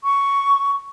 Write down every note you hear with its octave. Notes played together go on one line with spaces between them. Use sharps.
C#6